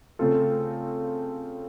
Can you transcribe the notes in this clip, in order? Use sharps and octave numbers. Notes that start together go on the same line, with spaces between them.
C#3 A3 C4 F4 A4